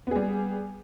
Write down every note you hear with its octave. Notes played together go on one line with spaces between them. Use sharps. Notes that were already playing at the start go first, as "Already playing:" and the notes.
G3 B3 G#4